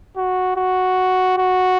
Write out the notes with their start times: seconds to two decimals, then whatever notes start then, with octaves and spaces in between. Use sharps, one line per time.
0.17 F#4
0.57 F#4
1.38 F#4